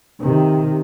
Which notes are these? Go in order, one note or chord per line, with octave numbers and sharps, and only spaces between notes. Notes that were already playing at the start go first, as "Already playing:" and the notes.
C3 D#3